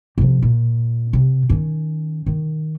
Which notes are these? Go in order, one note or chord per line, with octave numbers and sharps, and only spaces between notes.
C3 F3
A#2
C3
D#3 C#4
D#3